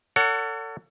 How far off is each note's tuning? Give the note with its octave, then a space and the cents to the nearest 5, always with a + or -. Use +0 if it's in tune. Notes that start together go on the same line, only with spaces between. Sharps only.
A4 +35 C#5 +40 F#5 +0